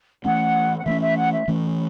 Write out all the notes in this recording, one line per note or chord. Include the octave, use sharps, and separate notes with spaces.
E3 A3 C#4 F#5
F#5
E3 A3 C#4 E5
E5
F#5
E5
E3 A3 C#4